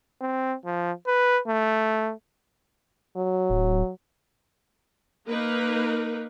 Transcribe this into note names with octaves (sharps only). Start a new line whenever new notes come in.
C4
F3
B4
A3
F#3
D1
A#3 D#4 A#4 B4